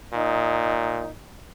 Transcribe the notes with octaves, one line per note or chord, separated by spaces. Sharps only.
A#2 D#4